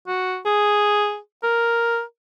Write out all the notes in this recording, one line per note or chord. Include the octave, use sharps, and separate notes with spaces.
F#4
G#4
A#4